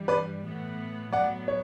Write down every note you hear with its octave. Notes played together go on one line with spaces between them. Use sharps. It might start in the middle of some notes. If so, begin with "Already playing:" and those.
Already playing: G2 E3 G3
B4 D5
A2 E3 B3
A2 F#3 B3 D5 F#5
C#5